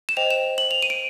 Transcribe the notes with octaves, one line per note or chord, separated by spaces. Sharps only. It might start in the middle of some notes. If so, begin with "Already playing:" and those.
E7
C5 D#5 G5 F7
E7
F#7
F7
D#7
D7